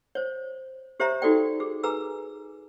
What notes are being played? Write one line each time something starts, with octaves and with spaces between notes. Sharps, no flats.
C5 C#5
G4 C5 C#5 E5 A#5
D#4 F#4 A4 D5 G5
G#4
G#4 B4 G#5 A#5 E6